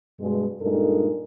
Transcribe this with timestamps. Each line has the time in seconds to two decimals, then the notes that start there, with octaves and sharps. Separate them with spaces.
0.20 G2 B2 G#3
0.61 G2 A#2 G#3 D#4 A4 A#4